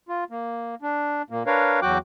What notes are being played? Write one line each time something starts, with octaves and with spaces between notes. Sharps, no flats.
F4
A#3
D4
A#2 A#3
D4 A#4 B4 C#5 F5
E2 F#3 F#4 G5 D6 F#6